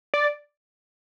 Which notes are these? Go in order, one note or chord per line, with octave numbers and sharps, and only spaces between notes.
D5